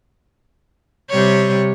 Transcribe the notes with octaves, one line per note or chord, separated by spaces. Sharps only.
C3 G3 C#5